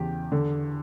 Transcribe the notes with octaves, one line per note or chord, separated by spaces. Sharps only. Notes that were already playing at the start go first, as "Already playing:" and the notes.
Already playing: E2 C#3 G4
D3